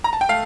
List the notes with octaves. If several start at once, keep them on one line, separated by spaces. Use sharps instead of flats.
A#5
A5
G5
A3 F5